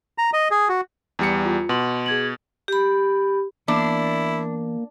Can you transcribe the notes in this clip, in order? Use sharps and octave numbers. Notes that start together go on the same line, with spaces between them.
A#5
D#5
G#4
F#4
E2 G3 C#7
F4
B2 C6 F#7
G#4 G#6 F#7
G4 B5
E3 A#3 B3 D4 E4